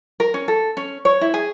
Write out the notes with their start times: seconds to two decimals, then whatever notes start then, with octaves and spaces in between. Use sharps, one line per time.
0.20 A#4
0.34 C#4
0.48 A4
0.77 C#4
1.05 C#5
1.21 E4
1.34 G#4